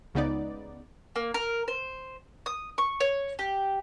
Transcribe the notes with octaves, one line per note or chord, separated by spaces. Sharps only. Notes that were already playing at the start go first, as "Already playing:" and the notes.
C#2 C#3 B3 D#4 D5
A#3
A#4
C5
D#6
C#6
C#5
G4